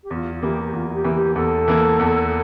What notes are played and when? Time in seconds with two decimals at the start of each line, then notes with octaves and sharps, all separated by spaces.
0.04 G4
0.10 E2 F4
0.34 F4
0.43 E3 A#3 G4
0.63 G4
0.73 E2 F4
0.88 F4
0.94 G4
1.04 E3 A#3
1.15 G4
1.36 E2 A4
1.68 E3 A#3
1.99 E2